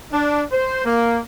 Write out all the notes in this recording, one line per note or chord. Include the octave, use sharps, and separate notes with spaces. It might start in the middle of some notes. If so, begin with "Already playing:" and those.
D4
C5
A#3